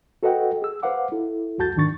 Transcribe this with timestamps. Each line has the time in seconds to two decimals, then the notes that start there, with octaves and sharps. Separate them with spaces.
0.23 F#4 A4 B4 D#5 F#5 G5
0.62 G#4 E6
0.83 B4 C5 F5 F#5 D6
1.12 E4 A4
1.58 C#2 F#2 F#4 A5 G6 A6
1.76 E2 G#2 D#3 D4 C#6 A6